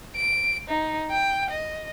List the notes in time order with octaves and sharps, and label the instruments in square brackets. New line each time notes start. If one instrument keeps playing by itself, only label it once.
[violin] D7
D#4
G5
D#5